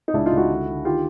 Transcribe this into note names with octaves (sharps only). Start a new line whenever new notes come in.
D#4
C#2 D4 E4
D#4 F4
C#2
E4 F#4
D3
D3
D#3 F4 G4